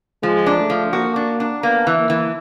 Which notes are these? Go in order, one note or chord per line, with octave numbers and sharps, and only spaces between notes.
F3 G#3
D4
A3
F3
A#3 F#4
D4
D4
A#3 B3
E3
A#3
E3